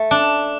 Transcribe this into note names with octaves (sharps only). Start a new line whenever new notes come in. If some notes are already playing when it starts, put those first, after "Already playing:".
Already playing: A3
D4